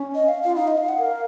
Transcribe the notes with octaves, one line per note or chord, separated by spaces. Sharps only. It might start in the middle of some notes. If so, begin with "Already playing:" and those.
Already playing: C#4
D#5
F5
F4 F5
D#4 F5
D#5
F5
F#5
A#4 F5